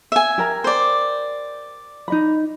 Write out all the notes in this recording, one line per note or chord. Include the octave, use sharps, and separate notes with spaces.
E5 G#5
G4 A#4 A#5
C5 D5
D#4 D#5 B5